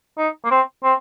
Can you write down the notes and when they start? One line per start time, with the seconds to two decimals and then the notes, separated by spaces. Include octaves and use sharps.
0.18 D#4
0.44 A#3
0.51 C4
0.84 C4